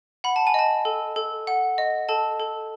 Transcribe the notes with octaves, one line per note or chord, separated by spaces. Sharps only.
F#5 B5
A5
G#5
D#5 A5
A4
A4
F#5
D#5
A4 A5
A4